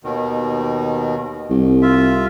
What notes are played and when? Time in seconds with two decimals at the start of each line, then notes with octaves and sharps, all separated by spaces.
0.04 D#2 B2 D#3
1.50 C2
1.82 F4 E5